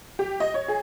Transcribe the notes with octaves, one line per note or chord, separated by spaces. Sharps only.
G4
D#5
C#5
G#4